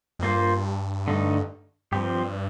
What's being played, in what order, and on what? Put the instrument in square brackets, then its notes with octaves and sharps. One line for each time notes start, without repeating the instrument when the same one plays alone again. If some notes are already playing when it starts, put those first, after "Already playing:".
[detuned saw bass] F2
[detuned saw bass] G2 [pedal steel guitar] A#3 F4 C5
[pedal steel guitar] D3 A3 D#4
[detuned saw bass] G2 [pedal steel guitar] F3 C4 G4